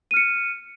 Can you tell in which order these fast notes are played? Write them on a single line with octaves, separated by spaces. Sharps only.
D#7 F6 C#7